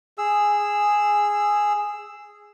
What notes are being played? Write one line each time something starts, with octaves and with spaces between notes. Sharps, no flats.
G#4 E6